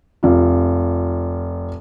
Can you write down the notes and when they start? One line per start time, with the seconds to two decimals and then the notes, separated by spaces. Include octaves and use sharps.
0.23 F1 F4